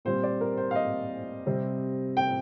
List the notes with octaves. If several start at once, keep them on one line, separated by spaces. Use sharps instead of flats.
A#2 G3 C4 C5
D5
A#4
C5
F5
D#5
C3 G3 C4
G5